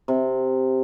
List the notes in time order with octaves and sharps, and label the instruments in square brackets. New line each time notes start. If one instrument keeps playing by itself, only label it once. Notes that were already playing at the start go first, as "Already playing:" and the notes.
[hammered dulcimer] C3